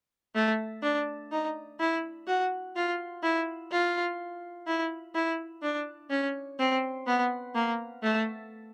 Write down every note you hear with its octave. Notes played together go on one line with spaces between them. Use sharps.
A3
D4
D#4
E4
F#4
F4
E4
F4
E4
E4
D4
C#4
C4
B3
A#3
A3